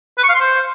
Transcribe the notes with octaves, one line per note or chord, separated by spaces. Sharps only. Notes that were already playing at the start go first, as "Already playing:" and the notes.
B4
C#6
F5
C6
C5